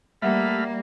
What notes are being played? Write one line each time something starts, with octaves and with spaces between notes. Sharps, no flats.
G3 A3 A#3 E5 F#5 B5 F6